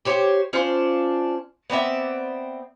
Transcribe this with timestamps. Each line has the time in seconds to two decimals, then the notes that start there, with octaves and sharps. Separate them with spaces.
0.05 G4 C5 C#5
0.53 C#4 D4 F4 C5
1.70 B3 C4 D5 E5